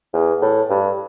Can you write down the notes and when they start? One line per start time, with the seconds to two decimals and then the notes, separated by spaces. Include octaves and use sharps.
0.13 E2
0.42 A2
0.70 G2